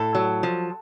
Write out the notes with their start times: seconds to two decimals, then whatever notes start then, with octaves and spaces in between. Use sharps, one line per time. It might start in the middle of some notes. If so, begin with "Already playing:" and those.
Already playing: A2 A4
0.15 F#3
0.43 F3